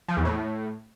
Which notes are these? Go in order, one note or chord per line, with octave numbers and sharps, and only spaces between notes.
F3
E2
A2